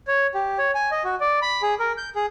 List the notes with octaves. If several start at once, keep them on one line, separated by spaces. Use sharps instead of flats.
C#5
G4
C#5
G#5
D#5
F#4
D5
B5
G#4
A#4
G6
G#4